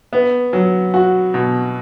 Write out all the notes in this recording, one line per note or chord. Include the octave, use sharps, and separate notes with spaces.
B3
F#3
F#4
B2